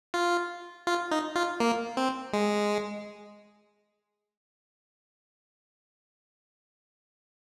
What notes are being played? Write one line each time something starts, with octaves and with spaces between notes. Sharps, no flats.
F4
F4
D#4
F4
A#3
C4
G#3